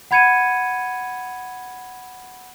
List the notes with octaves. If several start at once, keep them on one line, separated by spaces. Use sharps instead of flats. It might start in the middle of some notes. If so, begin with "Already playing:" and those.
F#5 B5 G#6 C#7 D#7